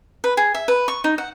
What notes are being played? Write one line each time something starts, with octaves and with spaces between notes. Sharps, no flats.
B4
G#4
E5
B4
C#6
D#4
F#5